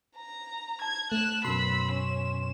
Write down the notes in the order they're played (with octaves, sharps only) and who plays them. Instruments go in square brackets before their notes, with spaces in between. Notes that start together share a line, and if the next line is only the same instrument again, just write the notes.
[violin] A#5
[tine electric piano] A5 [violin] G#6
[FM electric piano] A3 [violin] F#6 E7
[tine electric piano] F#2 B2 [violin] B5 E6 [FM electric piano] C6
[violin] C#4 E7